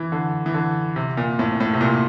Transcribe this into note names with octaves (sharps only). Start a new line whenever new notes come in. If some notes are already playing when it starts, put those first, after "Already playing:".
Already playing: E3
D3
E3
D3
C3
A#2
A2
A2
C3
A#2